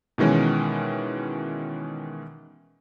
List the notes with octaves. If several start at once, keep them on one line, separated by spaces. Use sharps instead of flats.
B2 D#3 E3 G#3 C#4